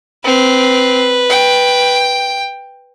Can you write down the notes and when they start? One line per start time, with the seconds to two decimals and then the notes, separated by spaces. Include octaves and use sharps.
0.25 C4 B4
1.30 G5